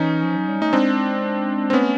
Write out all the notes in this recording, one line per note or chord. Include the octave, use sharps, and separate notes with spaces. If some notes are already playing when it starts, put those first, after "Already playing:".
Already playing: E3 C#4 D#4
F3
F#3
G3
A3 D#4
G#3 C4 D4
C4
A3 B3 C#4